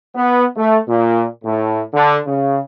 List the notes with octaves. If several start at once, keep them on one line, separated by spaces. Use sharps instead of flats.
B3
A3
A#2
A2
D3
C#3